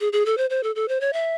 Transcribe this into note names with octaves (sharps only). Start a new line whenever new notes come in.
G#4
G#4
A4
C5
C5
A4
A4
C5
C#5
E5